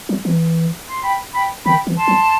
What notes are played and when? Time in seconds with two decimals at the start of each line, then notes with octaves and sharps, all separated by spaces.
0.09 F#3
0.25 E3
0.90 C6
1.03 G5 B5
1.34 G5 B5
1.66 D#3 G5 B5
1.87 E3
1.96 A5 C6
2.08 F#3